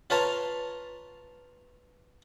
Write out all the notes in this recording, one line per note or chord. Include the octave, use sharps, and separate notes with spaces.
F4 B4 C#5 F5 A5 A#5